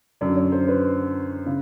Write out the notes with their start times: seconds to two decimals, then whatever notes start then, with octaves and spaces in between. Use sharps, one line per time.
0.21 F#2 D3 F#3 D5
0.35 C#5
0.52 C5
0.68 B4
1.46 C#3